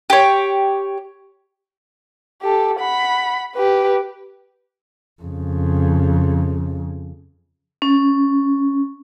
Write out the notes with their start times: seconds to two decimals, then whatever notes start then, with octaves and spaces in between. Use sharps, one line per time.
0.10 G4 C#5
2.42 G4 A4
2.80 F#5 B5
3.55 G4 B4
5.23 F2 C#3
7.82 C#4